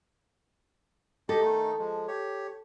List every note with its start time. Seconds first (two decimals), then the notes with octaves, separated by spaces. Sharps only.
1.29 G4 A4 D#5
1.41 D#3 A3 D#4
1.79 F3 G#3
2.08 G4 C#5